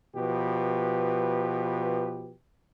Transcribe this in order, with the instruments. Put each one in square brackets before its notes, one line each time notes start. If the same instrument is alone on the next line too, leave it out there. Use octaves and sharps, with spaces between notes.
[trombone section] B2 F3 G4 B4